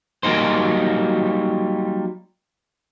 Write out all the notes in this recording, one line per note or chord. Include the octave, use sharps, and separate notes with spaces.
F#3 G3 A#3 D#4 C5